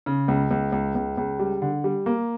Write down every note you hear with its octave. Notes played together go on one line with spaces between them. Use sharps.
C#3
C#2
C#2
C#2
C#2
C#2
G3
D3
G3
A#3